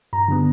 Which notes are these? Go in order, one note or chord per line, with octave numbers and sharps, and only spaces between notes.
G2 A#5
D3 G3 B3